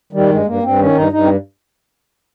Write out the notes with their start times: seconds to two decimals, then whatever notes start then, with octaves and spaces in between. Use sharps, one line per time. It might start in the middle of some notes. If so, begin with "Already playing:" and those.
0.13 D#3 G3
0.29 G2 G#3
0.46 G2 A#3
0.63 G2 C4
0.79 D#3 C#4
0.95 G2 D#4
1.12 G2 D#4
1.24 C4